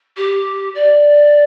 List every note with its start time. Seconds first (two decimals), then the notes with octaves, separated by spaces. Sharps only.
0.17 G4
0.75 D5